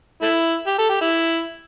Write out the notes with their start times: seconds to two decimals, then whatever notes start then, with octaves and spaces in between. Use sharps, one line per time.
0.22 A3 E4
0.67 G4
0.78 A4
0.90 G4
1.01 E4